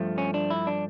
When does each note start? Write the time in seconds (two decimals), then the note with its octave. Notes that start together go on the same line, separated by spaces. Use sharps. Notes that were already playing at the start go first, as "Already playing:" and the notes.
Already playing: G2 F3 A3
0.18 C#4
0.34 D4
0.50 E4
0.67 D4